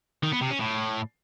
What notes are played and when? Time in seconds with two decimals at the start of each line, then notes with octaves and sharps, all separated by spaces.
0.23 D#3
0.32 B3
0.41 C3
0.50 C#4
0.60 A2